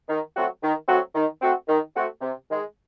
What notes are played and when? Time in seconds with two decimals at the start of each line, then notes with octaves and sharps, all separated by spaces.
0.09 D#3
0.35 F#3 A3 C4 F#4
0.63 D#3
0.88 F#3 A3 C4 F#4
1.15 D#3
1.42 A3 C4 F#4
1.68 D#3
1.95 A3 C4 F#4
2.21 C3
2.49 D#3 G#3